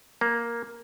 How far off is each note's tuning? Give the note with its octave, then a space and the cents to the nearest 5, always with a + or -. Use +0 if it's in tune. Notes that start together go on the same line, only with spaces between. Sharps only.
A#3 +5